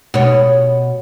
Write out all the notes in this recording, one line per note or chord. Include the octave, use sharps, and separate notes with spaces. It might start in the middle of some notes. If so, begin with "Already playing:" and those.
B2 C#5